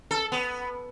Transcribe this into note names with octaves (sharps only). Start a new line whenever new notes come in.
A4
B3